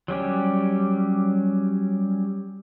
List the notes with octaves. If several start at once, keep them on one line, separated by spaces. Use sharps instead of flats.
F#3 G3 C#4 G4